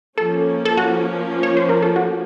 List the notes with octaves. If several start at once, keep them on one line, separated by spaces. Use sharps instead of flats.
F3 A#3 C#4 A4
A4
F#4
C#5
C5
A#4
A4
F#4